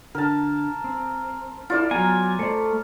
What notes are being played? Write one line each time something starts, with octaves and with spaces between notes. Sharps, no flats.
D3 A#4 A5
C4
E4 F4 A4 D5
F#3 B3 G#5 A#5
A3 C5 D5